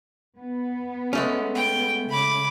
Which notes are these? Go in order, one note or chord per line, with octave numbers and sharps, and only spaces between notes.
B3
G#3 A3 C#4
G5
C#3 B5 D6